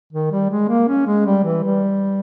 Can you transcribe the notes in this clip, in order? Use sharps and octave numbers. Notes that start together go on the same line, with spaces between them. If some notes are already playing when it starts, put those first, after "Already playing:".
D#3
G3
G#3
A#3
C#4
G#3
G3
E3
G3